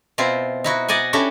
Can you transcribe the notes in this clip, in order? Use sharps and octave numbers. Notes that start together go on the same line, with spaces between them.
B2 C4 E4 F4 C5
D#4 E4 F#4
D5 D#5 F#5 G#5
C#4 D4 E4 F#4 G4 A4